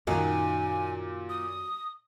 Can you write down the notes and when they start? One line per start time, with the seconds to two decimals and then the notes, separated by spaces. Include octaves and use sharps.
0.07 F#2 A#2 D#3 F#3 A#3 D#4 G#5
1.29 D#6